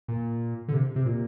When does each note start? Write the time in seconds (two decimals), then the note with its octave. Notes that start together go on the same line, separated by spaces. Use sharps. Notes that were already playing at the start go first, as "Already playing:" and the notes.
0.08 A#2
0.68 D3
0.74 C3
0.96 C3
1.06 A#2